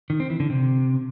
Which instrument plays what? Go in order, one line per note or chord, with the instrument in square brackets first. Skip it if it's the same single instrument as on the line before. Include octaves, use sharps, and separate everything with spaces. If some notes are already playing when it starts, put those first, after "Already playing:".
[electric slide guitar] D#3
C4
E3
D3
C3